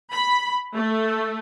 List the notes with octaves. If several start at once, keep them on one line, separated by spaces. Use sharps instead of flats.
B5
A3